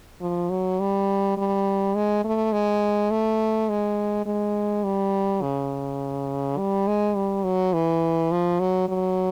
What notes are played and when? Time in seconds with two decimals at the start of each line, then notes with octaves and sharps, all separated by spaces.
0.21 F3
0.50 F#3
0.80 G3
1.37 G3
1.96 G#3
2.24 A3
2.53 G#3
3.11 A3
3.69 G#3
4.26 G#3
4.84 G3
5.42 C#3
6.57 G3
6.87 G#3
7.16 G3
7.45 F#3
7.73 E3
8.32 F3
8.60 F#3
8.89 F#3